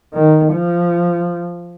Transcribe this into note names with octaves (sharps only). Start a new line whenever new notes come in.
D#3
F3